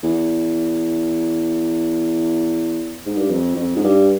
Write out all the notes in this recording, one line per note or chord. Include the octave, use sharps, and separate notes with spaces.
E2
G#2
G2
F2
F2
G#2
G2